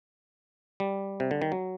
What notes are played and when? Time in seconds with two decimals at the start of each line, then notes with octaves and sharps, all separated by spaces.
0.80 G3
1.20 C3
1.31 D3
1.42 D#3
1.52 F#3